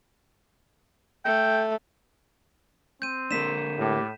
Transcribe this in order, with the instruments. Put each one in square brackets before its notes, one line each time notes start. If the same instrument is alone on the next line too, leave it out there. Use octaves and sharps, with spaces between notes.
[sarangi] A3 [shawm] G5
[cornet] C4 [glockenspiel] G6 D#7
[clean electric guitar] D3 A#3 D4 [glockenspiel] B6 E7
[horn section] A2 [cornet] G4